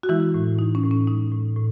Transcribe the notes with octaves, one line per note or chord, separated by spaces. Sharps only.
F#4
E3 G#3 E4
A2
A2 D#4
C#4
A2
C#4
G#3 D#4
A2
A2